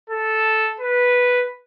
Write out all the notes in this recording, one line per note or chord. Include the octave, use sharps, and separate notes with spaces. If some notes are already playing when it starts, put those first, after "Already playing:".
A4
B4